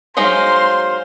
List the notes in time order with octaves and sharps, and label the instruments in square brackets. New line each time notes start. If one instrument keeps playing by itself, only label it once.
[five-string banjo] F#3 G#3 D#4 [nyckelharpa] C5 F5 [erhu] C6